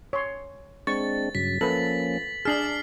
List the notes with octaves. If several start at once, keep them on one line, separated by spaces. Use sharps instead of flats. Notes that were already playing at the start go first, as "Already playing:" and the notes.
C#5 C6
G#3 C4 D4 C#6 A6
G2 C#3 F#3 B6
F3 A#3 C#4 A4 B4 F#7
D4 G#4 A5 F6 C7 F#7